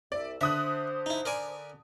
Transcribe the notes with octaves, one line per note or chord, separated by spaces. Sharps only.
C2 D5 E5
D3 C5 E5 D#6 F#6
D#4 E4
A#4 D5 G#5